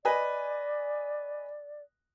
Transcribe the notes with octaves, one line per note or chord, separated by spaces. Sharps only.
B4 D5 D#5 G#5